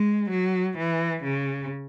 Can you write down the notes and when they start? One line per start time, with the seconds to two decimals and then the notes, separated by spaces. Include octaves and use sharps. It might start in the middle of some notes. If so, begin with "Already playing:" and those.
Already playing: G#3
0.31 F#3
0.78 E3
1.24 C#3